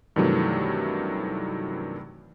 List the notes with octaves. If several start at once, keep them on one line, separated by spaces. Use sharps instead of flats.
G2 C3 D#3 E3 F#3 A3